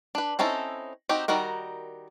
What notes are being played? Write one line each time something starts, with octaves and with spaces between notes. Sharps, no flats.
D4 B4
C4 C#4 D#4 E4 A4
C4 D#4 F#4 G4
D#3 G3 D#4 F#4 A#4